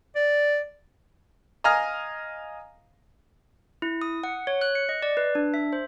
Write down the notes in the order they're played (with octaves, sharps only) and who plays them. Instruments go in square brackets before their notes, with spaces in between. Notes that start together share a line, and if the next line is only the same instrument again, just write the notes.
[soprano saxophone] D5
[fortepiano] D#5 F5 G#5 A#5 D#6 F6
[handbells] E4
D#6
F#5
C#5
F#6
C#7
D#5
D5
B4
D4
E5
C5